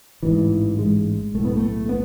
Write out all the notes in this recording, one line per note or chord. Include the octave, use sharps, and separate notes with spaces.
A1 G#2 E3
G#3
B1 A2 A3
B3
A3
B3